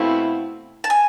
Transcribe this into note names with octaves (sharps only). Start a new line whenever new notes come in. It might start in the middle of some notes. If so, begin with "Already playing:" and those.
Already playing: B2 A3 C4 E4 F5
A5
G#5